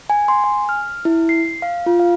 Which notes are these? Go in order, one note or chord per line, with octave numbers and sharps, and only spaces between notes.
G#5
C6
G#5
F6
E4
C7
F5
F4
F5